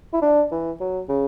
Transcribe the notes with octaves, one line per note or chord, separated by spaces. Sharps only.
E4
D4
E3
F#3
C#3